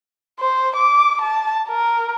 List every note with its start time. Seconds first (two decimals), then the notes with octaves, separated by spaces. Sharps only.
0.40 C5
0.76 D6
1.21 A5
1.69 A#4